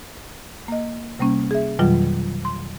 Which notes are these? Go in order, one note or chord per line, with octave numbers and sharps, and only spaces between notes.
A#3 D#5
C3 G3 A#3 C#4
G#4 E5
F2 B2 D#3 F#3 G3 F4
C6